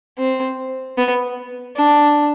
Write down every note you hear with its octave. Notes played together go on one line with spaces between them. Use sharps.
C4
B3
D4